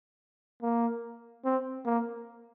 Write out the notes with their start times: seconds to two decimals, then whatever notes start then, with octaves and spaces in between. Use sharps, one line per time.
0.62 A#3
1.45 C4
1.86 A#3